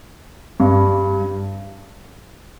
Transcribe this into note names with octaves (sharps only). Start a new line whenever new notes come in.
G2